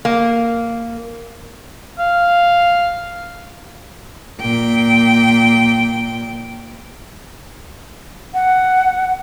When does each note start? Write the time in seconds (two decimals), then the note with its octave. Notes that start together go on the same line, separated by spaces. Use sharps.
0.05 A#3
1.99 F5
4.41 A#2 G5
8.34 F#5